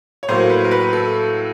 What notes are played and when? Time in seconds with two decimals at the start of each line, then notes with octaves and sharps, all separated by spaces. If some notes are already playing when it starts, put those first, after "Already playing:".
0.23 C#5
0.28 A2 F#3 A#3 C5
0.50 B4
0.64 A#4
0.71 B4
0.93 A4